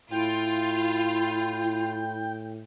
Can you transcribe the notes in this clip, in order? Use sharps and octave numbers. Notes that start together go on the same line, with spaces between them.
A2 E4 F4 G5